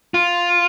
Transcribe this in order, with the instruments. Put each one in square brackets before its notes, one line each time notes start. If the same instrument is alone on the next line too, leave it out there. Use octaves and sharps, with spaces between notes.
[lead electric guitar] F4